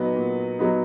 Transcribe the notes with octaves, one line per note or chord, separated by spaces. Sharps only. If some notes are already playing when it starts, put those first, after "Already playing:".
Already playing: A#2 F#3 B3 D#4
A#2
F#3 B3 D#4